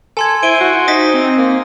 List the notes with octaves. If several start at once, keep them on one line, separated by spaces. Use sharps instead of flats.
A4 G#5 C6 G#6
E4 C5 D7 D#7 G7
F#4
D#4 D#6 A#6 B6
C4
A#3